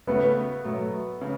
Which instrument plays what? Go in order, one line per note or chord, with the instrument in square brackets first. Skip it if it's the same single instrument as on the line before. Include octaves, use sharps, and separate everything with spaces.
[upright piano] C#3 A3 F#4 B4 [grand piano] B3
[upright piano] B2 F#3 A3
C#3